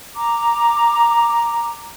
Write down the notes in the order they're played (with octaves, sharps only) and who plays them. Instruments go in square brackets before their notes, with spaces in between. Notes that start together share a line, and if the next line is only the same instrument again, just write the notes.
[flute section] A#5 D6